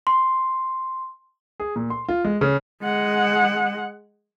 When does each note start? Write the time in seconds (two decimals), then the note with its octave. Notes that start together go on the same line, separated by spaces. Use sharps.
0.07 C6
1.60 G#4
1.76 A#2
1.90 C6
2.09 F4
2.25 G#3
2.41 C#3
2.82 G#3 F#5